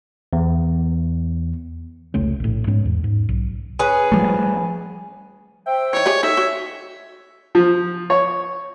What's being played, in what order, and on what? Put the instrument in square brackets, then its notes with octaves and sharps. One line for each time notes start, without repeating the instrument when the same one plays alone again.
[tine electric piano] E2
[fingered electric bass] F1 C#2 A3 C#4
A#1 A2
G#2 B3 C#4
E2
G#2
B1
[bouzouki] C#4 G#4 B4
[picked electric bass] F3 G3 A3
[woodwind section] C5 E5 G5
[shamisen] E3 D#4 [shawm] C#5
[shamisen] G4 G#4 D#5
[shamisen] D#4 A4 [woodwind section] C#5 [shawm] E5
[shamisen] F#4
[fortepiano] F3
C#5